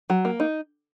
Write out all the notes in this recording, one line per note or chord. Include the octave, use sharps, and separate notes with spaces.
F#3
A#3
D#4